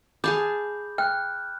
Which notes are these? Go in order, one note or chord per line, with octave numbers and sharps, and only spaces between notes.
G#4 F5 A5 B5 D6 G6
G5 F6 F#6